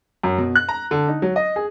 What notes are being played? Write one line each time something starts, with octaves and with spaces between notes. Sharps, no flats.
F#2
B2
F#6
A#5
D3
D#4
F#3
D#5
G#4